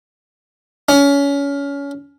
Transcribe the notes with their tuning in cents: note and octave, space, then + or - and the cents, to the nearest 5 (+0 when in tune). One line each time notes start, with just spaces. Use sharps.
C#4 +25